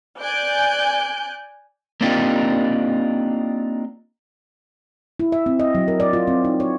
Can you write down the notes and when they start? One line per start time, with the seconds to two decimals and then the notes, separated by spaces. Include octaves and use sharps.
0.21 D5 G#5 F#6 G6 D7
2.01 A#3 C4 D4 D#4 F4 G4
5.20 E4
5.32 E5
5.46 C4
5.60 D#5
5.75 F#3
5.88 A#4
6.00 D5
6.13 F4
6.28 C4
6.45 D#4
6.60 C#5